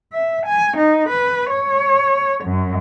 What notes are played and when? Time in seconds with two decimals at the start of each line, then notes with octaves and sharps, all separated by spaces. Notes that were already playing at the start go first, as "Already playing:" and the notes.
0.12 E5
0.46 G#5
0.78 D#4
1.09 B4
1.50 C#5
2.45 F#2